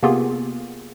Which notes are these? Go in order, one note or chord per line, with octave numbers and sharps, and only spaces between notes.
C3 A#3 B3 F4 G4 G#4